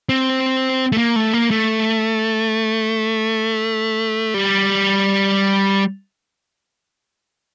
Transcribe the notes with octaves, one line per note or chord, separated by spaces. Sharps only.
C4
A3
A#3
A3
A#3
A3
G3